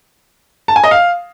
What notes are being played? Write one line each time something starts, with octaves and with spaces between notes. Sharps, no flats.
A5
G#5
D#5
F5